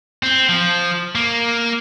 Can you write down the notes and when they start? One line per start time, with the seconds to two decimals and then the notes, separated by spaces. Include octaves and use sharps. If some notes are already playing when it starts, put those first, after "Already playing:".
0.23 C4
0.49 F3
1.15 A#3